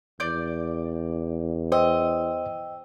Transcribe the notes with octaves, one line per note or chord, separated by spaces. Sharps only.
E2 D5 G6
C5 D#5 G5 E6